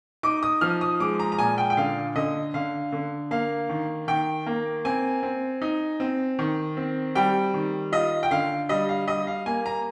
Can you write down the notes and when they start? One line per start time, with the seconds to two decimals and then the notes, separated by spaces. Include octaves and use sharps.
0.23 D#4 D6
0.43 D#6
0.61 F3 F6
0.81 D#6
1.00 G#3 D6
1.20 A#5
1.32 A#5
1.39 A#2 G#5
1.58 G5
1.70 G5
1.77 D3 F5
2.15 D3 D#5
2.54 D3 F5
2.92 D3
3.31 A#3 F5
3.69 D#3
4.08 D#3 G5
4.46 A#3
4.85 C4 G#5
5.23 C4
5.62 D#4
6.00 C4
6.39 D#3
6.77 C4
7.15 G3 G5
7.54 D#3
7.92 F4 D#5
8.23 G5
8.31 D3 F5
8.69 G3 D#5
8.89 F5
9.07 G3 D#5
9.27 F5
9.46 A#3 G#5
9.66 A#5